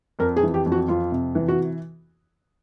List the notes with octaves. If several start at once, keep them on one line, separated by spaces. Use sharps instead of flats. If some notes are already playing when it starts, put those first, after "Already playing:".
F2 A#4
G#4
E3
G4
F2
F#4
F2 F4
C3
E3
F#4